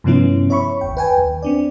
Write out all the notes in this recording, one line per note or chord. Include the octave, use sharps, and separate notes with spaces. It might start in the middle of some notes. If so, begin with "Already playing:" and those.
G2 C3 F3 B3 C#4 E4
C#5 E5 B5 C#6
G1 D#2 G5
B4 G5 G#5
D#2
C4 D4 D5